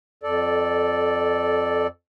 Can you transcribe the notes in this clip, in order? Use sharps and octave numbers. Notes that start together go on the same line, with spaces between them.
F2 A4 D5